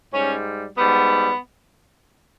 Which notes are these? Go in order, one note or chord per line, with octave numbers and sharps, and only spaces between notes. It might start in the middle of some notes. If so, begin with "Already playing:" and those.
G#2 G3 C#4
G#2 G3 B3